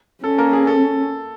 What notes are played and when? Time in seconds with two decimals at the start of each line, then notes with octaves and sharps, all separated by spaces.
0.24 C#4 A4
0.38 A#3 A#4
0.53 G#4
0.67 A4